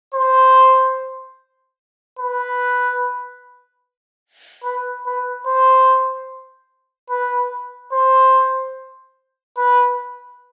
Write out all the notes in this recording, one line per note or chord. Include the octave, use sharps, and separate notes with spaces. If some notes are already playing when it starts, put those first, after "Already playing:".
C5
B4
B4
B4
C5
B4
C5
B4